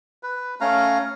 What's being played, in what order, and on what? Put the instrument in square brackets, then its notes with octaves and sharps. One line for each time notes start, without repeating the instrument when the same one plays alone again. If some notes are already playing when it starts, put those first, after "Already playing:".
[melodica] B4
A3 C#4 F5 A#5